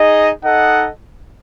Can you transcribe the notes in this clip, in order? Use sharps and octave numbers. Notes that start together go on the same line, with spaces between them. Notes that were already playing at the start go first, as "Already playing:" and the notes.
Already playing: D#4 G#4 D#5
D#4 A4 D#5 F#5